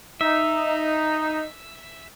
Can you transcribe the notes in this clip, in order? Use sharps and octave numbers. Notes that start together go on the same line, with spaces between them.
D#4 E5